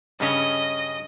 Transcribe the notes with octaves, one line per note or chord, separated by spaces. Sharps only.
G2 C#3 C#4 D#5